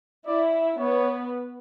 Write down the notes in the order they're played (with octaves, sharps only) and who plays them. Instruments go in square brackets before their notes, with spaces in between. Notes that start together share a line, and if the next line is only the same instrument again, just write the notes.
[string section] E4 [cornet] D5
[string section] B3 [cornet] C#5